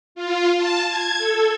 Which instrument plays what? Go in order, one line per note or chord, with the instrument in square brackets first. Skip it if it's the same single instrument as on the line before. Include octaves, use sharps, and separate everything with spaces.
[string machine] F4
A5
G#6
A4